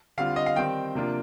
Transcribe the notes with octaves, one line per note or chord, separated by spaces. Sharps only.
D3 G3 C4 F4 F5
D#5
F5
D#3 G3 C4 G5
C3 F3 A#3 D4 F4